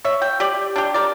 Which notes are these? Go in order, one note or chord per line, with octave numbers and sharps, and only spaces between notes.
C#5 E5
G5
G4 D5
D4 G4
A#4 D5